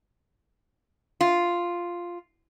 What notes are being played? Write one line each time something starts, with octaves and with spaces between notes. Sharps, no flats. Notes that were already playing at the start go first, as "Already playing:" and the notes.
F4